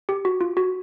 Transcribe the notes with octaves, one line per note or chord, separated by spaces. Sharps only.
G4
F#4
F4
F#4